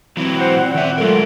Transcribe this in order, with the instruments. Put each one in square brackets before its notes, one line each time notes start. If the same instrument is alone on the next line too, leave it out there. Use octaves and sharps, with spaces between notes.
[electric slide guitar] E3 F#3 [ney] C4
[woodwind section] C5 F#5
A#2 F#5
[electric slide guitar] D#3 E5
[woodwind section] F#3 A3 F4 [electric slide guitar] G#3 A#4 [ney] A4